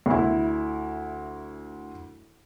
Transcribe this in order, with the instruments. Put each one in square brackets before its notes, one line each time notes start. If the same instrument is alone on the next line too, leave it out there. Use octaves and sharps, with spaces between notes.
[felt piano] D2 E4